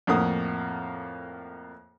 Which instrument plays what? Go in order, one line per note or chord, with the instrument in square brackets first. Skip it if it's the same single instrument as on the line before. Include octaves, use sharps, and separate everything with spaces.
[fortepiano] F2 A2 A#3 F#5 D#6